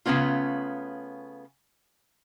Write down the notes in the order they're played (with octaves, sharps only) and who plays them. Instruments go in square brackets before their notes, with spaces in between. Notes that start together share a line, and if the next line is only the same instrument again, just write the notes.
[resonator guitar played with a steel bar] C#3 A3 B3 C#4 F4